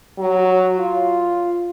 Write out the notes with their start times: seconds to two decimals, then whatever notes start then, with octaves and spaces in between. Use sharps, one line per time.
0.18 F#3
0.79 F4